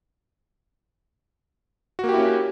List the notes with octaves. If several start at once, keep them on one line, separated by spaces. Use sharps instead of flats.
A#3 C#4 E4 F#4 G4